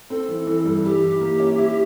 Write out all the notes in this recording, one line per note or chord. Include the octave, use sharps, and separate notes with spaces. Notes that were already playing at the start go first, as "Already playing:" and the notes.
C4 A4
E3
E3
G2
E3 G4
E3
A#3
C#4
E4